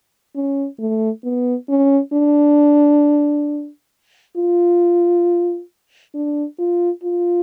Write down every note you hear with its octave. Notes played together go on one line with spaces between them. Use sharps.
C#4
A3
B3
C#4
D4
F4
D4
F4
F4